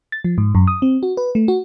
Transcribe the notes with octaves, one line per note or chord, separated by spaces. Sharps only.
A6
F3
G#2
F#2
D#6
C4
F#4
B4
A3
F#4